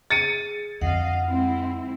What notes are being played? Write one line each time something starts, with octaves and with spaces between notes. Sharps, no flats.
G#4 A6 C#7 D#7
F2 D3 D#5 F5 F#5
G#3 C4 E4